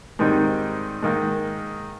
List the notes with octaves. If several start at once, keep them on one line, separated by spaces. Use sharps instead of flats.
G#2 D#3 G3 C4 D#4
G#2 D#3 A#3